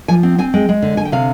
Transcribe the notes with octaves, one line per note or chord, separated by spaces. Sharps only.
F3 G#5
C4
C4 G#5
G#3 G5
G#3
D3
D3 G#5
G5
C3 F5